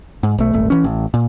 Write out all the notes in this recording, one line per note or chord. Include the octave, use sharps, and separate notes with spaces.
G#2
B1 A3
D#1 G#1 A3
E3 C#4
A1
A#2